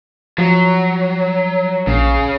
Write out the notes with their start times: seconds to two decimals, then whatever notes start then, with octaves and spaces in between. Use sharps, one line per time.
0.38 F3 F#3
1.87 A#1 C#3